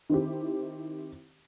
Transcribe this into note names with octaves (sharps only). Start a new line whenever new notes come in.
D#3 C4 E4 G4